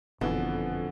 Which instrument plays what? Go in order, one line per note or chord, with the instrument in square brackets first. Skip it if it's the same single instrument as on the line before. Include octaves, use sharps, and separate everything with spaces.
[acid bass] F#1 [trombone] F2 [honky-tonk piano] B2 E3 [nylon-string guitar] D3